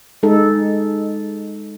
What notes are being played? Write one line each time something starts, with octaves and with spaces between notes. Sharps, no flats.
G#3 D#4 A4